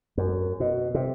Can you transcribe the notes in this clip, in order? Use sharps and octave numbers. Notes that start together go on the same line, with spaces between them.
F#2
B2
C3